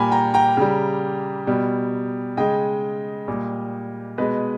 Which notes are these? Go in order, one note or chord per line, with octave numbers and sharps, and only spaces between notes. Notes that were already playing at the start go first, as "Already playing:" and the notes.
Already playing: A#2 G3 G5 G#5 A#5 B5
G5 A#5
G5 A#5
C#3 G3
B2 G3
C#3 G#3 D#5 G5
A#2 G3
B2 G#3 B4 D#5